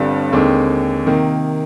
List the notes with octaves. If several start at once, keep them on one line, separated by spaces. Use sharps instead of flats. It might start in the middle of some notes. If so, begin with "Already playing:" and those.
Already playing: G1 G2 D3 G3 C4
D#2 D3 G#3 C4
C3 D#3 A#3